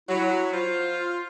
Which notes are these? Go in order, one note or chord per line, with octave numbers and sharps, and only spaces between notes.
F#3 E4
F4 C5